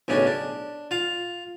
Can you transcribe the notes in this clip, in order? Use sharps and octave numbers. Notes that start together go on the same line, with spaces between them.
B1 A2 C#3 C#4 D4
D4
F4 F5